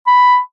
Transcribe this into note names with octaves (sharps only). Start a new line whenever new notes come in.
B5